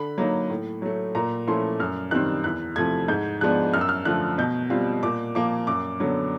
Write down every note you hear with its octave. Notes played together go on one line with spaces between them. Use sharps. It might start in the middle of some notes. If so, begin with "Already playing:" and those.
Already playing: D3 B5
F#3 A#3 D#4
A2
F#3 A3
A#2 A#5
F3 A3 C#4 E4 C6
F#2 F6
D#3 G3 C4 F#6
E2 F#6
C3 F3 A3 G#6
G#2 G6
F3 G#3 B3 D4 F#6
F#2 F6
E6
F6
D3 F3 A3 F#6
B2 G6
G3 C4 F4
A#2 D6
F3 A#3 D6
F#2 D6
D3 F#3 B3